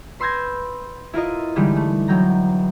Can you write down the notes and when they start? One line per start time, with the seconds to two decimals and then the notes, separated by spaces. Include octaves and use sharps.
0.20 B4 C6 E6 G6 G#6 A#6
1.14 E4 F4 A#4 D#5
1.56 D3 E3 G3 G#3 D#4
1.77 A3
2.08 E1 F#3 G5 A#5